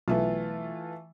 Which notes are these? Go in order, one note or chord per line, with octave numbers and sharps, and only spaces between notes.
B1 E3 A3 F4